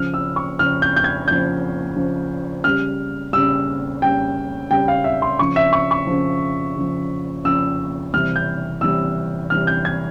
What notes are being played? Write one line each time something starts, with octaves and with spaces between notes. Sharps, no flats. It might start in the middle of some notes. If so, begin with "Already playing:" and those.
Already playing: C#3 F3 F6
E6
C#6
C#3 F3 F6
G6
G6
G#6
C#3 F3 G6
C#3 F3
C#3 G3 F6
C#3 G3 E6
C#3 G3 G5
C#3 G3 G5
F5
E5
C6
C#3 F3 C#6
E5
C#6
C#6
C#3 F3
C#3 F3
C#3 F3 E6
C3 E3 G3 F6
G6
C3 E3 G3 E6
C3 E3 G3 F6
G6
G#6